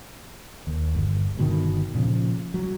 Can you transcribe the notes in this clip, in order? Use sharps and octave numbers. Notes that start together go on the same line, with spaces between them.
D#2
G1
G1 B2 D#3
A#2 C#3 F3
F#3